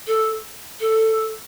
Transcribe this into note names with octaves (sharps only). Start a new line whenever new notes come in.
A4
A4